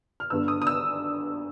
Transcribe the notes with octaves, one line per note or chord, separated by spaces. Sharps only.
F6
G1 G2 D3 E6
D#6
D#6
E6